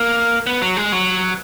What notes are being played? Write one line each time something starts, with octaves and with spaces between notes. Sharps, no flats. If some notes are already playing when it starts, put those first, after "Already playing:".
Already playing: A#3
B3
F#3
G#3
F#3